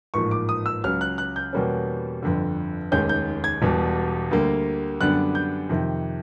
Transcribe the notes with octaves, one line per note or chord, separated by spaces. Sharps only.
A1 G#2 F3 A#3 C#6
D6
D#6
E6
C#2 C#3 F#3 F6
F#6
F#6
G6
E2 B2 G3 A#3 C#4
G1 F2 D3
F1 D#2 D#3 G#3 C#4 G6
G6
G#6
E1 E2 B2 G3
D2 D3 G3 A#3
F#2 D3 G3 B3 D4 F#6
G6
F2 C3 D#3